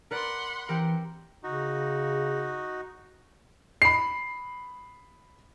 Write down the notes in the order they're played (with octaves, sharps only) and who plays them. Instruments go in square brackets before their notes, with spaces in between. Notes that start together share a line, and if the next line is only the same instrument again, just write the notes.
[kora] A#4 B4 D5 [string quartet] F#5 B5 C6
[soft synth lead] E3 [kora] C4 G4 A#4
[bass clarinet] C#3 [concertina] D#4 F#4
[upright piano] B5 C7